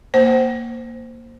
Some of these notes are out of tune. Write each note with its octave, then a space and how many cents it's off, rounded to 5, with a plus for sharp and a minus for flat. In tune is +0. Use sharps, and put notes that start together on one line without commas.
A#3 +0 C5 +0 F#5 +35